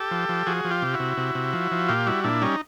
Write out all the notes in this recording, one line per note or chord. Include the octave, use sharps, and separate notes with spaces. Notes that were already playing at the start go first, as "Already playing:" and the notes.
Already playing: G4 A4
F3
F3
F3 F#4 G#4
F3
F4 G4
C3
E4 F#4
C3
C3
C3
F3
F3
A#2 F4 G4
G3 E4 F#4
A#2 D4 E4
G3 C#4 D#4